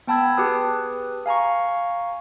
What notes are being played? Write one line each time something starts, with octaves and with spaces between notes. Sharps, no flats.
B3 G5 A5 B5 E6 G#6
G4 G#4 B4 D#6
F5 G#5 A#5 C#6